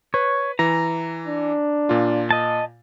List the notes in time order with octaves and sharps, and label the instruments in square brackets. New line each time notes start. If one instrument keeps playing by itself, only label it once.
[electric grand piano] B4 [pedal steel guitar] C#5
[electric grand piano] E3 [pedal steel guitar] A#5
[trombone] D4
[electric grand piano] A#2 F4
[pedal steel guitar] D#5 A5